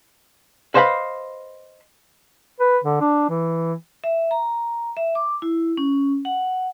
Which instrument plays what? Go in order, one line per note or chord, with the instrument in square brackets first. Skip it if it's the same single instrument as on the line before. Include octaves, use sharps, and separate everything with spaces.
[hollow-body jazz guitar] B4 C5 D#5 F5 G#5 B5
[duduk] B4
D3
D4
E3
[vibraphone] E5
A#5
E5
D6
E4
C#4
F#5